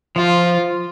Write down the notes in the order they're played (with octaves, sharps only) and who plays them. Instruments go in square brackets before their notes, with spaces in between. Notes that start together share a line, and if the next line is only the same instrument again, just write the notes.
[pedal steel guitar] F3 [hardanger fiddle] F4